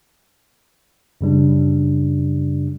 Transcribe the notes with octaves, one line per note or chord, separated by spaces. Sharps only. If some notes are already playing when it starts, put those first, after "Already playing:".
F#2 C#3 G3 D4